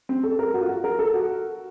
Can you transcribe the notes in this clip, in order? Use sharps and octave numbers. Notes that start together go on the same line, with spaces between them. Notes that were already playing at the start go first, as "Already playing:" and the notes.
C4
A4
A#4
F#4
F4
F#4
A#4
A4
F#4